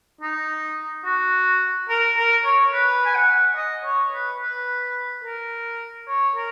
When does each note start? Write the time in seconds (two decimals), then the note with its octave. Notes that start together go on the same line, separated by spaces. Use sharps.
0.21 D#4
1.05 F#4
1.89 A#4
2.17 A#4
2.45 C#5
2.73 B4
3.05 G#5
3.15 F#5
3.56 D#5
3.85 C#5
4.12 B4
4.41 B4
5.24 A#4
6.08 C#5
6.36 A#4